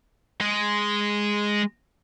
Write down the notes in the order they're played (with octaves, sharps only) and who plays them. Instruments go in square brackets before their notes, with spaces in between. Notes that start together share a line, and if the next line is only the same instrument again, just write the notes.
[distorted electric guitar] G#3